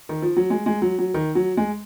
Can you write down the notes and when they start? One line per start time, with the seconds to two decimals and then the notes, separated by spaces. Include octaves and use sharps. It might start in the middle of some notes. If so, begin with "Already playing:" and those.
0.09 D#3
0.22 F3
0.37 F#3
0.50 G#3
0.66 G#3
0.82 F#3
0.99 F#3
1.14 D#3
1.35 F#3
1.57 G#3